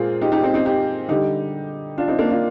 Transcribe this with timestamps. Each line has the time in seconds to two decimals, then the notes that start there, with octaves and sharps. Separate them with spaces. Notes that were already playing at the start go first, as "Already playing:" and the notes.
Already playing: A#2 G#3 A#3 C4 F4 G#4
0.22 D#4 G4
0.32 D#4 G4
0.43 C4 D#4
0.54 C4 D#4
0.66 D#4 G4
1.09 D3 G3 D#4 G4
1.98 D4 F4
2.08 C4 D#4
2.19 A#3 D4
2.30 D4 F4